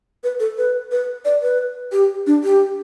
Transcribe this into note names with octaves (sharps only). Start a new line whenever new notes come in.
B4
A4
B4
B4
D5
B4
G4
D4
G4